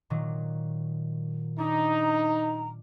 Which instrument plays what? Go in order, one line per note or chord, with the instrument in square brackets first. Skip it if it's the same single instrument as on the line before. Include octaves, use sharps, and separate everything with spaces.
[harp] A#2 D#3 F#3
[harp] D4 [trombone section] D#4 [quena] A#5